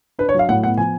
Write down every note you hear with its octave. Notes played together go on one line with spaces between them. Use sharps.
D4 B4
C#5
F#3 F5
A2 F#5
B3 F#5
F3 G#5